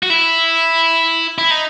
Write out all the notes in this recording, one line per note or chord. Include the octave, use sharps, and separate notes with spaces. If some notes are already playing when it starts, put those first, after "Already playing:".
F#4
E4
E4
D#4